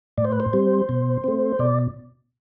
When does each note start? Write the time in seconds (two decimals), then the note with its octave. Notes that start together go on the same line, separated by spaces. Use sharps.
0.17 A2 D5
0.25 C5
0.32 B4
0.40 C5
0.53 G3 C4
0.89 B2
1.24 A3 C4
1.59 B2 D5